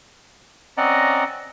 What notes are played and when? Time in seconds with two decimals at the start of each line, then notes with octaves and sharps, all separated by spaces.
0.77 C4 C#4 D5 D#5 F#5 A#5